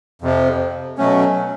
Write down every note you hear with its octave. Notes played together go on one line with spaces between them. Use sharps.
F2 C3 F3
B2 F#3 A3 C#4